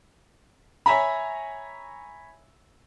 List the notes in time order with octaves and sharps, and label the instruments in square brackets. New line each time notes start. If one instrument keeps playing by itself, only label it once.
[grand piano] C#5 E5 G#5 A#5 B5